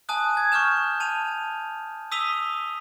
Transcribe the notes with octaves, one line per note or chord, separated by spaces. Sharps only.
G#5 A5 D#6 F#6
G#6
C#6 D6 F6 G6 E7
A5 D#7 F7
D#6 E6 B6 D#7 F7 G7